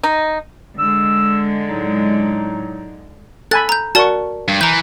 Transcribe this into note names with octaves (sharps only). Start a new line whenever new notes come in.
D#4
D3 G#3 E6
A2 F#3 D#4
A4 G#5 B5 F#6 A6
A#5 G6
F#4 A#4 D5 A5 C#6
G2
E3 A#5 G6